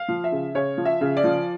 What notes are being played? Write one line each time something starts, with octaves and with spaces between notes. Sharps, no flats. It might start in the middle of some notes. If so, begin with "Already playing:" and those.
Already playing: F5
F3
E5
C#3
C#3 C#5
F3
E5
C#3
D5
F3